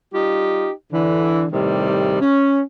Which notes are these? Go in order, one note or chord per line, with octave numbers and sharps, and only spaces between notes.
G3 D#4 F4 G4
D3 E3
A2 C3 D#3 G3
C#4